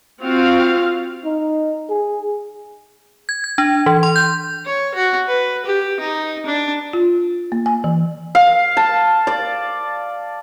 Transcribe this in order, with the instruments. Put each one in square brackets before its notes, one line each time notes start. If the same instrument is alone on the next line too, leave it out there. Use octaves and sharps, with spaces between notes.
[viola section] C4 F4 F#4 F5
[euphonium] D#4
G#4
[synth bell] G#6
G#6
D4
E3
C6
G6
[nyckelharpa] C#5
F#4
B4
G4
D#4
D4
[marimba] F4
A#3
G#5
E3
[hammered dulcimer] F5
A5
D5